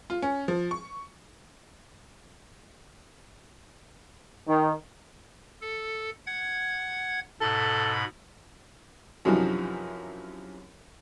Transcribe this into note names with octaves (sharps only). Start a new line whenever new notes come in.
F4
C#4
F3
C#6
D#3
A4
F#5 G#6
G#2 B2 A4 B5
F#2 C3 E3 F3 D#4 F#4